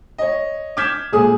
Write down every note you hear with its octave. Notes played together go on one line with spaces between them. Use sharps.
C#5 D#5
D6 F6 G6 G#6 B6 E7
D#1 G#3 G#4 D#6